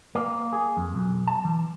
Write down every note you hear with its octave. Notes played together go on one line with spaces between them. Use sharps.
A#3
G#4
F2
B1
A5
E3